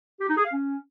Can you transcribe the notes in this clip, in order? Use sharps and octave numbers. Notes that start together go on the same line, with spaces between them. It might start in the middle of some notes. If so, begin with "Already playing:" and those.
G4
D#4
G#4
F5
C#4